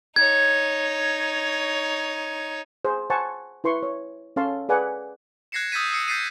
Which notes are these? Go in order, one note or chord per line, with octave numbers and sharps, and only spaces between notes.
D#4 C#5 G#6
G#4 C5
C5 F#5 G#5 A5 C#6
E4 B4 C6 C#6
C#5
C#4 A4 C#5 F5 A5 C6
G#4 B4 D5 F#5 G#5
F#6 G#6 A#6 C7 C#7 E7
D#6 E6 G6 A6 B6 D#7
D#6 E6 C7 C#7
G6 A6 B6 C7 D#7